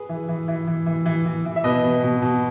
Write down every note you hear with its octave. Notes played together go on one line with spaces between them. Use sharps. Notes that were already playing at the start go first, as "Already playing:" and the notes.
Already playing: G#4 B4
E3
E3
E3
E3
E3
E3
E3
E3
E5
B2 B4 D#5
B2
B2
B2